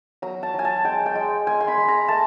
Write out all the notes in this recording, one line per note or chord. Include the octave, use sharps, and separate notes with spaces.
F#3 A#5
A5
F#3 G#5
A5
G#3 G5
G5
G#3
G#3 G#5
C6
B5
G#3
A#5
A3 A5